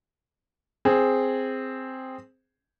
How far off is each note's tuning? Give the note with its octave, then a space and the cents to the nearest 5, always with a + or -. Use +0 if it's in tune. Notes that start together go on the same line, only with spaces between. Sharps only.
C4 +0 G#4 +0